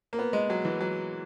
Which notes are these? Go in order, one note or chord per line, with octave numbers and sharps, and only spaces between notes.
A#3
B3
G#3
F#3
E3
F#3